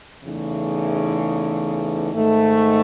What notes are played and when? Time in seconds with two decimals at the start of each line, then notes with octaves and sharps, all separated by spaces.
0.24 E2 C#3 E3 A3 D#4
2.12 G#2 D#3 A3